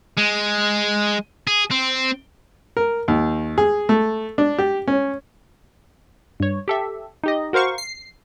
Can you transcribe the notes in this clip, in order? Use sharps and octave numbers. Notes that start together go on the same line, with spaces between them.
G#3
G#4
C4
A#4
D#2
G#4
A3
D4
G4
C#4
G2 C#5
G4 A4 E5
D#4 G4 D#5
F#4 A#4 C5 F5 C#6
C7